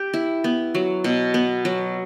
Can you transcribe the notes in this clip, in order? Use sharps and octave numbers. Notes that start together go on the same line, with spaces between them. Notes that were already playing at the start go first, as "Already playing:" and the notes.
Already playing: G4
E4
B3
F#3
B2
B3
F#3